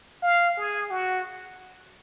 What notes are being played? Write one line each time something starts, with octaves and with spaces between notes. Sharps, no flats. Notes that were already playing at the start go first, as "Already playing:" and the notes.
F5
G#4
F#4